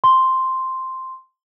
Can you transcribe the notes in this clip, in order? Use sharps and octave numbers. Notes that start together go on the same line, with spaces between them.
C6